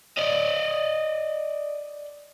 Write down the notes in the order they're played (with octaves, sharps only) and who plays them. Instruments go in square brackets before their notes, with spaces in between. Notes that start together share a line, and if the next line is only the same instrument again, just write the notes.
[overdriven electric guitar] D5 D#5